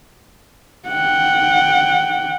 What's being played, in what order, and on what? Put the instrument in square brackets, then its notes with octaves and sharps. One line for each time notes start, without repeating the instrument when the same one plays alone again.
[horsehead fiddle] F#5 G5